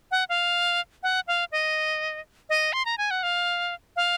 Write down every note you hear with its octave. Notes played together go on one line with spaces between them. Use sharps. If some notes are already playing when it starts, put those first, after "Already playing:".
F#5
F5
F#5
F5
D#5
D#5
C6
A#5
G#5
F#5
F5
F5